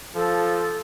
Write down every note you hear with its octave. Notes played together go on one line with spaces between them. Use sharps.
F3 A4